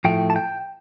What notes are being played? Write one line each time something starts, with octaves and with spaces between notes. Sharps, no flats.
A2 F3 A3 G5
A5
G5